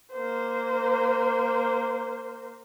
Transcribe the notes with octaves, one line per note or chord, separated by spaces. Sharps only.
A#3 C5